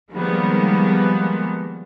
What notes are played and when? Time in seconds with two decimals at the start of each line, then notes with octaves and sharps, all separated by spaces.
0.11 D#3 F3 G3 G#3 A#3 B3